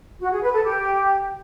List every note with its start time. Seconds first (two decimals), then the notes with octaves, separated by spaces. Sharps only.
0.20 F#4
0.31 G#4
0.42 B4
0.52 A4
0.63 G4